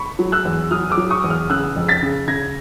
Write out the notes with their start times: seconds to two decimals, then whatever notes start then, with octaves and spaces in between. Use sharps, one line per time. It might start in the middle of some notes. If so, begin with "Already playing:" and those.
Already playing: B5 C#6
0.19 F#3
0.32 E6 F#6
0.45 E2
0.71 F#3 D#6 F6
0.90 D6 E6
0.97 F#3
1.10 C#6 D#6
1.24 E2
1.30 D#6 F6
1.50 C#3 E6 F#6
1.76 F2
1.88 A6 B6
2.03 C#3
2.28 C#3 G#6 A#6